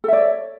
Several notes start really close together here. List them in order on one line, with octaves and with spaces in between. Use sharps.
A4 E5 D5 C#5